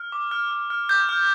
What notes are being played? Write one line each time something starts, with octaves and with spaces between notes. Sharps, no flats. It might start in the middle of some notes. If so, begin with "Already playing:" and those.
Already playing: F6
D6
F6
F6
F6
D6 G6
F6